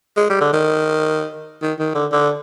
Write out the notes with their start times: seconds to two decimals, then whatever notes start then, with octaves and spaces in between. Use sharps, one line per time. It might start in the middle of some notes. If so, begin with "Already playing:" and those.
0.17 G#3
0.30 G3
0.41 D3
0.53 D#3
1.63 D#3
1.79 D#3
1.95 D3
2.12 D3